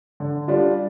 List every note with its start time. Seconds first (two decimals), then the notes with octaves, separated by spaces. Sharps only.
0.20 D3
0.48 G3 D4 F4